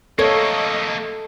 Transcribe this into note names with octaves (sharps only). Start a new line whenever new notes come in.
A3 A#3 A4 C#5 D#5 F5